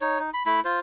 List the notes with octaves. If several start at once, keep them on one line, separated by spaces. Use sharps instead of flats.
D#4 C#5
D#4
B5
A3 E4 B5
F4 C5